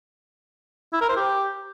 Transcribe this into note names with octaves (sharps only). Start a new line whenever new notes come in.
E4
A#4
C5
G4